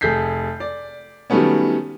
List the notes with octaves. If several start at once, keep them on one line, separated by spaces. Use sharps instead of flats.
F1 G#4 A4 G6 B6 C7
D5
D#3 F#3 G3 A3 B3 C#4